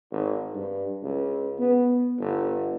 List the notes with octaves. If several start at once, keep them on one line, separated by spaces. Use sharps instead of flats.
G#1
G2
C#2
B3
G1